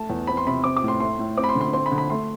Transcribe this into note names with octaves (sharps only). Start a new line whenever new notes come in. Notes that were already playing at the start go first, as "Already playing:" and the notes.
Already playing: A3 A5
E2
C4 B5
C6
C3 B5
C4 D6
D6
A2
C6
A3 C6
A2
C4 D6
B5
C6
D3
C6
C4 C6
B5
D3
B5
A3 C6